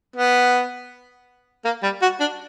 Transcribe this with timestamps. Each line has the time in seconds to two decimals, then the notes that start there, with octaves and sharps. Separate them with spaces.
0.16 B3
1.64 A#3
1.83 G3
2.02 F#4
2.20 D4